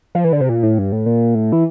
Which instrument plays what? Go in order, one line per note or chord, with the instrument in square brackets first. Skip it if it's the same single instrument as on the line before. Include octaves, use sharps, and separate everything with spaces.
[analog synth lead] F3
E3
D3
C3
A#2
A2
G2
A2
A#2
A2
E3